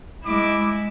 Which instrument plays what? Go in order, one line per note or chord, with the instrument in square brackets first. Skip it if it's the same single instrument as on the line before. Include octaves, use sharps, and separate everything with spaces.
[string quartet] G#3 E4 [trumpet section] D6